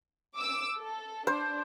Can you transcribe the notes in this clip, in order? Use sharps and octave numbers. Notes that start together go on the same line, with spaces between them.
D6 E6
A4
D4 C5